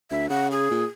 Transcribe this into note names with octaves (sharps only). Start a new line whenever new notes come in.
D2 E5
C#3 F#5
G#4
A#2